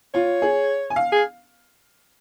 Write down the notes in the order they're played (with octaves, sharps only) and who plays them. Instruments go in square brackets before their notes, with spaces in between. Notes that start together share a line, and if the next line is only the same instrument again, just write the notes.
[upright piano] F4 [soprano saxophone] C#5
[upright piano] G#4
G#5
F5
[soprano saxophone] G#4